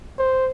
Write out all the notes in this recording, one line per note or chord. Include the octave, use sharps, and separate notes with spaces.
C5